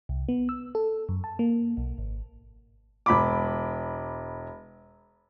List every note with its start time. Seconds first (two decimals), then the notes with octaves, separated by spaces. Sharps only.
0.09 C2
0.29 B3
0.49 E6
0.75 A4
1.09 F#2
1.24 A5
1.39 A#3
1.77 B1
1.98 G#1
3.06 E1 B5 D6